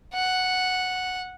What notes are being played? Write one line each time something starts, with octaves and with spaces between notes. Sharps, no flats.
F#5